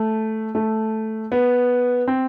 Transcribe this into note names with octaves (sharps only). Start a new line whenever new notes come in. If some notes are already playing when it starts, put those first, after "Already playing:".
Already playing: A3
A3
B3
C4